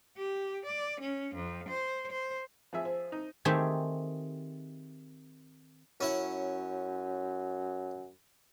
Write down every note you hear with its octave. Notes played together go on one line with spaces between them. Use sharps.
G4
D5
C#4
F2
C5
C5
F3 G#4 E5
C5
D#4
D#3 A3 C4 G4 G#4 E5
F#2 C#4 E4 F#5